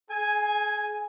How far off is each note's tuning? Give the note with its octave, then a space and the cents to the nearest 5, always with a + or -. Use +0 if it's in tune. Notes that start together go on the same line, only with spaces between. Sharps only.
G#4 +30 G#5 +0